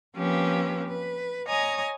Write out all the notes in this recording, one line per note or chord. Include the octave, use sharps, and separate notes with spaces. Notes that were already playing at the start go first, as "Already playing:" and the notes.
F3 A#3 C4 C#4 G4 B4
B4
C#5 D#5 G#5 A#5 D#6